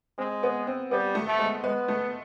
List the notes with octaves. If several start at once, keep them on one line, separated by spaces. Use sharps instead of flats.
G#3 C4
B3
C4
G3 B3
A3
A3
G#3
G#3 B3
A3